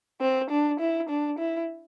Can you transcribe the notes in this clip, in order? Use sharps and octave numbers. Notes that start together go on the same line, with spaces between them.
C4
D4
E4
D4
E4